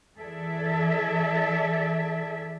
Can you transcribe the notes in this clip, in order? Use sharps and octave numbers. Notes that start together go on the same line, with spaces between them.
E3 G#4 A4 D5 E5